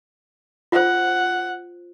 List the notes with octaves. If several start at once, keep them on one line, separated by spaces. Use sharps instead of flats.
F4 C5 F#5